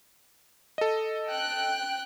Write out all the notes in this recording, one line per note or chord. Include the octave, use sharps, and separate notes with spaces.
A4 D#5
G5 F#6